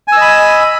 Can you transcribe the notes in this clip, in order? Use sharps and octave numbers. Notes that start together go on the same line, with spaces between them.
D#5 G#5 B5 E6